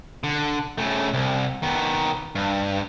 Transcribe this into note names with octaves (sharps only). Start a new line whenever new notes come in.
D3
C#3 A3
C2
D#3 B3
G2